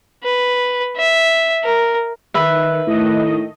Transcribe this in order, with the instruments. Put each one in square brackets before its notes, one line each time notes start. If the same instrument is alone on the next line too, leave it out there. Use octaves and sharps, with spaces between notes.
[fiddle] B4
E5
A#4
[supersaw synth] D#3 [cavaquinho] B4 E5
[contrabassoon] A2 [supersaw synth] D#3 A3 D#5